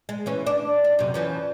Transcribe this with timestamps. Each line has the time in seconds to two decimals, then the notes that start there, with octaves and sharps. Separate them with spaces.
0.09 G#3
0.26 E3 C#4
0.46 D4
0.84 D4
0.99 F#2 C3
1.14 E3 F3 C#4